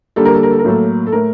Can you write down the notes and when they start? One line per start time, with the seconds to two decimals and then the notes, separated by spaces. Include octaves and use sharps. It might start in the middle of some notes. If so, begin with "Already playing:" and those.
0.16 D3 G3 A#3 A4
0.25 A#4
0.34 A4
0.43 A#4
0.51 A4
0.59 A#4
0.64 A2 F#3 A#3 A4
1.07 A4
1.12 A2 A3 A#4